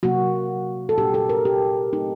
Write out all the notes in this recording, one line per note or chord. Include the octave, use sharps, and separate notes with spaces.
C3 F#3 A#3 F#4
A4
A#2 F#3 A#3 D4 G4
A4
A#4
G4
F#3 A3 C4 D#4